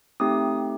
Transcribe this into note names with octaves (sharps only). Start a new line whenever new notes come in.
A3 C4 D#4 G4 D#6